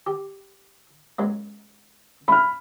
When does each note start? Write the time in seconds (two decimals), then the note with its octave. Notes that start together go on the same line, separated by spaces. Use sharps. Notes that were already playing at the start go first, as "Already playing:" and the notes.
0.07 G4
1.19 F#2 G#3 A#3
2.28 A3 B5 F6